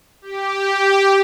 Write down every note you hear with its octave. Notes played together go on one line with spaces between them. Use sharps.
G4